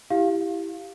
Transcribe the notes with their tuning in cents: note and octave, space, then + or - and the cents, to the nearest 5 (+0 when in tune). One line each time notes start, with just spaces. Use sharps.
E4 +0 G4 +0 F5 +0